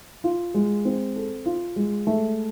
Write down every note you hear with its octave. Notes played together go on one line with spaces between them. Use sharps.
F4
G#3
C4
A4
F4
G#3
A3